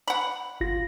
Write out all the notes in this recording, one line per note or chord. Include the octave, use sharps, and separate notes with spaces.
F#5 B5
G#1 F4 A#6